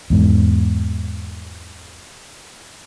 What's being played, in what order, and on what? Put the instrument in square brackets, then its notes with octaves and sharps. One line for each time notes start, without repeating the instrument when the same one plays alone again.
[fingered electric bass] E2 G#2